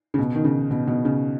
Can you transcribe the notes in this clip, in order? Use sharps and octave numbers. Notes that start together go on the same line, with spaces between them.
C#3
B2
D#3
C#3
B2
B2
C#3